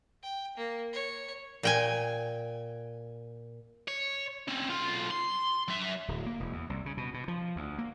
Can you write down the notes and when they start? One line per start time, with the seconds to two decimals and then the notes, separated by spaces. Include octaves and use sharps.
0.23 G5
0.57 A#3
0.93 C#5
1.63 A#2 G5 G#5
3.88 C#5
4.48 C4 C#4
4.70 B1 F4
5.10 C6
5.68 F#3 E5
6.08 D1
6.26 A#3
6.40 E1
6.53 E2
6.69 C2
6.86 C#3
6.97 B2
7.14 B2
7.28 F3
7.56 D2
7.78 A#3